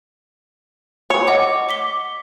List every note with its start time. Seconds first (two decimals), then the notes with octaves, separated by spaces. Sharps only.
1.10 C#5
1.27 D#5 F#5 D6
1.69 D6 B6 G7